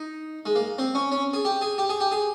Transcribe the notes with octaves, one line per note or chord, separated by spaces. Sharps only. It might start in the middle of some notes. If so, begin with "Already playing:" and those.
Already playing: D#4
G#3
A#3
C4
C#4
C#4
G#4
G4
G#4
G4
G#4
G4
G#4